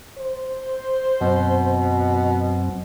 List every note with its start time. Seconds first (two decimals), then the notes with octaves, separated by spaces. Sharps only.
0.18 C5
1.21 F#2 B2 F#3 C4